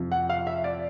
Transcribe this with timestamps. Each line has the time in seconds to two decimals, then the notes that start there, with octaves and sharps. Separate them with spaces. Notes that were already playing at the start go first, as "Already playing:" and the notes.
Already playing: F2 C3 F3
0.12 F#5
0.30 F5
0.47 E5
0.64 D5